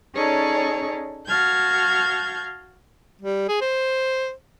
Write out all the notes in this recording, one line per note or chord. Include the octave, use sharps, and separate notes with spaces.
C#4 D#4 G#4 A4 C#5 D5
F#4 F5 A5 F6 G6 G#6
G3
G#4
C5